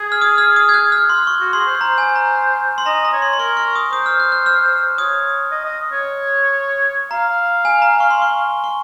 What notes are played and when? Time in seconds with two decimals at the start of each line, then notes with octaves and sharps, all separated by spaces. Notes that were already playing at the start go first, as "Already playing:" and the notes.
Already playing: G#4
0.12 F6
0.22 D#6
0.38 F6
0.56 D#6
0.69 G#6
0.74 F#6
0.92 F6
1.10 C6
1.27 C#6
1.41 F#4
1.53 G#4 C6
1.67 C5
1.75 C6
1.80 C5 A#5
1.98 G#5
2.16 A#5
2.78 C6
2.86 D#5 A#5
3.05 A#5
3.13 C#5
3.22 C6
3.33 C6
3.39 A#4 C#6
3.57 C#6
3.75 D#6
3.93 C5 D#6
4.06 F6
4.20 F#6
4.32 F#6
4.46 F6
4.98 C#5 D#6
5.51 D#5
5.65 D#5
5.92 C#5
7.11 F5 A#5
7.65 G#5
7.82 A#5
8.00 C#6
8.11 C6
8.22 C#6
8.64 C#6